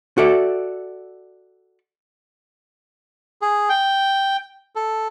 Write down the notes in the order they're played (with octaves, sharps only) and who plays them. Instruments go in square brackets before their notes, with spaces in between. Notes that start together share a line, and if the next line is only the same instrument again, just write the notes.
[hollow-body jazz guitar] F#4 A4 D5 E5
[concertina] G#4
G5
A4